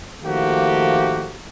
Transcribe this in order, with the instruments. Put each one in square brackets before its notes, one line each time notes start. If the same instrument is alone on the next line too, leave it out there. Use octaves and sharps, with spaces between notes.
[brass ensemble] D#3 F3 A3 A#3 F#4 G4